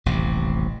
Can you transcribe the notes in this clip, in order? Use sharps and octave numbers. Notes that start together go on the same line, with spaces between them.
D#1 A1 C3